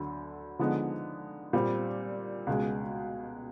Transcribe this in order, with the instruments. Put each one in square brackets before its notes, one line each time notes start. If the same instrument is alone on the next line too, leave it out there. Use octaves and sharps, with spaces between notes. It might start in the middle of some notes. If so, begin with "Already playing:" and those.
Already playing: [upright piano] D2 D3 F#3
D3 F3 G#3 B3 D#4
A#2 G3 C4
C#2 B2 G#3